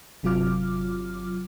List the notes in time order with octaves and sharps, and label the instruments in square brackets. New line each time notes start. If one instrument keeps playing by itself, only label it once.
[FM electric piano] G1 C3 F#3 F4 D6 F6